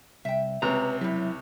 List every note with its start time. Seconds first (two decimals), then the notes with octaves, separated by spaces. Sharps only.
0.25 C2 E5 G5
0.62 C#2 C3 B4 A#5
1.01 F#3 G3 E4 G4